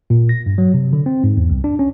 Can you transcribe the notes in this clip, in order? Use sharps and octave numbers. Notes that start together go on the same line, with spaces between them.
A#2
A#6
G2
F#3
C3
D3
C4
G#2
E2
C2
D4
C#4